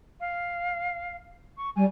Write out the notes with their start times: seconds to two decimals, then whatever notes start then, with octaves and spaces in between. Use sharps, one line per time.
0.21 F5
1.57 C#6
1.76 G3 G#5